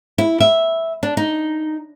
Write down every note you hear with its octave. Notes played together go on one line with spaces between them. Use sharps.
E4
E5
D4
D#4